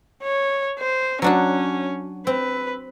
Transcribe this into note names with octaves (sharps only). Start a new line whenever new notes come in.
C#5
C5
F#3 C#4 D4 F#4
C4 B4